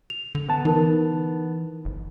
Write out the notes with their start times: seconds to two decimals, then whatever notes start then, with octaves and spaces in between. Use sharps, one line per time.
0.10 F7
0.35 D3
0.49 B3 A5
0.65 E3 D#4 A#4
1.85 G1